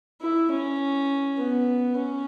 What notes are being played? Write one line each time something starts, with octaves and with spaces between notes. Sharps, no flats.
E4
C#4
B3
C#4